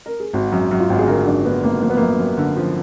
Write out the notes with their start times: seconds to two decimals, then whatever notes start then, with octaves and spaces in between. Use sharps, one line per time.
0.06 A#4
0.20 G#4
0.33 G#1 F#4
0.52 F#2
0.71 F#2
0.80 F4
0.89 G#1 F#4
0.99 G#4
1.08 D3 A#4
1.26 F#2 D4
1.45 D3 B3
1.64 G#1 A#3
1.82 F3 A#3
1.90 B3
1.97 F#2 A#3
2.19 F#2
2.38 D3
2.57 F3